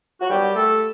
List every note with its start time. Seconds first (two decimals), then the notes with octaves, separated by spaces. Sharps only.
0.21 F#4
0.30 D#3 F#3 G3 B3 G4
0.55 A3 A4